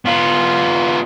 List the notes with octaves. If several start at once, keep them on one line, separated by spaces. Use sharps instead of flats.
B3 F4